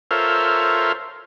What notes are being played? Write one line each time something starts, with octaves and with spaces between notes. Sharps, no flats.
F4 A4 A#4 C5 C#5 E5